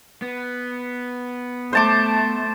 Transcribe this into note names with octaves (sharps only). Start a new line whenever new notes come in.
B3
A3 C5 A5 D6